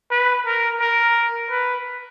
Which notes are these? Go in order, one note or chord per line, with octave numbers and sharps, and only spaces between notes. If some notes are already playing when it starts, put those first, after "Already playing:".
B4
A#4
A#4
B4